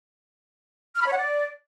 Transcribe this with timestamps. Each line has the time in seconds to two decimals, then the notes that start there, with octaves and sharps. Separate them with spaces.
0.96 F6
1.01 B5
1.07 C#5
1.12 F#5
1.18 D5